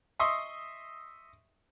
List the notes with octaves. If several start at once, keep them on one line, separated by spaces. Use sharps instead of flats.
D#5 E5 C6 C#6 D#6